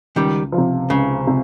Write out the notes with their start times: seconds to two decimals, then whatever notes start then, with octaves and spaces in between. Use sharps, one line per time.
0.16 C#2 D#3 G3
0.52 F3
0.58 C3
0.90 C#2 C#3
1.27 C3